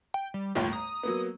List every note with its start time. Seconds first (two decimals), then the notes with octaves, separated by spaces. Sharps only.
0.14 G5
0.34 G3
0.55 G1 D#2 A2 F4
0.73 A#5 D#6
1.03 F#3 A#3 B3